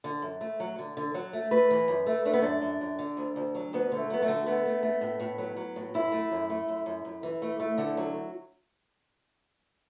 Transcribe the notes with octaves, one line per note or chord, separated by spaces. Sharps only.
D3
F#2
A3
F#3
D3
D3
F#3
A3
A3 B4
E3
F#2
A3
A3 D4
B3
F#2 D4
F#2
F#2
D3
D2
D2
F#3
D2 B3
D3
A3
F#3 B3
A3
D3
A3 B3
A3
A3
A2
A2
F#3
F#3
A2
F#2 E4
A3
F#2
A3
F#2
F#2
F#2
E3
A3
A3
D3
F#3